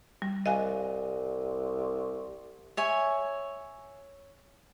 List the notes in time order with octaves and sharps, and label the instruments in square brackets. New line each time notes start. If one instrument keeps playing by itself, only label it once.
[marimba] G3
[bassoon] C2 [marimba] D#5 F5 G#5
[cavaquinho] C#5 E5 G#5